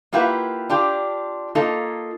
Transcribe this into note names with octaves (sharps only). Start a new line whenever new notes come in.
A#3 E4 F4 G4 B4 F#5
D4 F4 G4
A#3 D#4 F4 A4